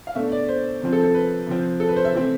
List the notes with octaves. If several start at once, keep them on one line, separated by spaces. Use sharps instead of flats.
F5
B2 A3 D4 E5
D5
C5
C3 F3 C4
A4
A4
B4
C3 F3 C4
A4
B4
C5
E5
C3 E3 A3 C4